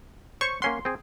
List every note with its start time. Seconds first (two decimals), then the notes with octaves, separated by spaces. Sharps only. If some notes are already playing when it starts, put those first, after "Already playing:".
0.41 C5 C#5 C#6
0.62 A#3 C#4 F#5 C6
0.85 C4 G#4